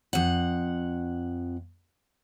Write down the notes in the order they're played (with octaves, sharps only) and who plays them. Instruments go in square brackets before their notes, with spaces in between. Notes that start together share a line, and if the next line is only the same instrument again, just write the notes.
[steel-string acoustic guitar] F2 F#5